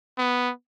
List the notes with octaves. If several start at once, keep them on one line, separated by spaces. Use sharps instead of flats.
B3